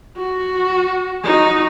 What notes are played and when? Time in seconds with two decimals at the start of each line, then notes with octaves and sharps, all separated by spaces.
0.17 F#4
1.24 D#4 F#4